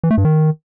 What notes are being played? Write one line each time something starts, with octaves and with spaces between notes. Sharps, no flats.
E3
A3
G2
D#3